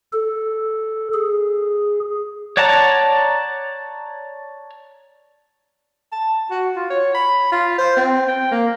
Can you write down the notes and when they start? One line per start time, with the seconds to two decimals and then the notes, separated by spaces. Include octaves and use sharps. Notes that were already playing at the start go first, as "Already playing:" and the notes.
0.13 A4
1.14 G#4
2.57 C#5 D5 F#5 A5 A#5
6.12 A5
6.51 F#4
6.76 F4
6.90 C#5
7.14 B5
7.52 F4
7.78 C5
7.97 C4
8.28 G5
8.51 A#3